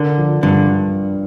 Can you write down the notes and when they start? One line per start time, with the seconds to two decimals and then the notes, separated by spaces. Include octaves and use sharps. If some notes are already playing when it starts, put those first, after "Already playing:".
Already playing: D3 D4 A#4
0.18 F3
0.43 G2 D3